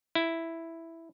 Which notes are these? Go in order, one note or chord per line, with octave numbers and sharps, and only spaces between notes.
E4